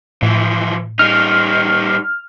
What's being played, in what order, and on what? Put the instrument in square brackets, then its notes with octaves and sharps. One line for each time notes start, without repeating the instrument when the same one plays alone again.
[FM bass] A2 [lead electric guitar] E3 F3
[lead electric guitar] G3 D#4 [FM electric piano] F6